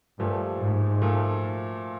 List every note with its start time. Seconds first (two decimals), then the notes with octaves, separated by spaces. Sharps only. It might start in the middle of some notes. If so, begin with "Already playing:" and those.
0.19 G2 A#2 F3 A3
0.61 G#2
1.02 A#2 F3 A3